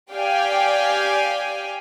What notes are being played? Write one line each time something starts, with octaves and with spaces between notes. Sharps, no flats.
G4 D5 F5 G5 G#5